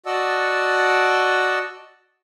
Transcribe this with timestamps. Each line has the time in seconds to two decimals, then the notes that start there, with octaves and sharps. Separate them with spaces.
0.06 F#4 D5 D#5 F#5 A5 E6